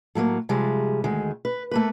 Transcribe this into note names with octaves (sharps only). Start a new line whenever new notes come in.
A2 F#3 A3 A#3
C3 F3 G3 G#3
D2 D#3 G#3
B4
A3 A#3 B4